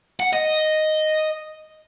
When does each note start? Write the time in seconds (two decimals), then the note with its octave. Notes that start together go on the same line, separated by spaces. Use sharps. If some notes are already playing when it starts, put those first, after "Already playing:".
0.20 F#5
0.33 D#5